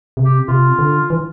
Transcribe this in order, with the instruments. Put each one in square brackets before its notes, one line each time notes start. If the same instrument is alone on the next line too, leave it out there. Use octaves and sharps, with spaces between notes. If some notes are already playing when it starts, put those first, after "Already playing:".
[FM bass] C3
[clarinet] G4
[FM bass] C3 [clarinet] F4
[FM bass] D3
E3